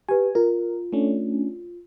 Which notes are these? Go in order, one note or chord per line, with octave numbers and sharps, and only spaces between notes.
G4 B4 G#5
F4 A#4
A3 C#4 D4